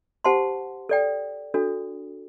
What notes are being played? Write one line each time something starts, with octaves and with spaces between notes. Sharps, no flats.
G4 C5 F#5 A5 C6
A4 D5 G5
D4 F#4 A4